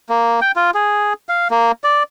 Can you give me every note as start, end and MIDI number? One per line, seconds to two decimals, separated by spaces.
0.09 0.40 58
0.42 0.52 79
0.56 0.71 65
0.74 1.13 68
1.29 1.48 77
1.51 1.72 58
1.84 2.03 74